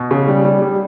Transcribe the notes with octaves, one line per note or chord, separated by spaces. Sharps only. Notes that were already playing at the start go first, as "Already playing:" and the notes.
Already playing: B2
C#3
G3
G3
G3